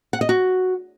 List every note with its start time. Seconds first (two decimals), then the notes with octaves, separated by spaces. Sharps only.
0.13 F#5
0.21 D#5
0.29 F#4